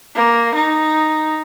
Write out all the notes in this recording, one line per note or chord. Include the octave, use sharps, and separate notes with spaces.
A#3
D#4